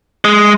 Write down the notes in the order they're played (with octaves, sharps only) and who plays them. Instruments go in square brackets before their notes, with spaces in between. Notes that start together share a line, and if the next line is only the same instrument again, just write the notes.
[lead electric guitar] G#3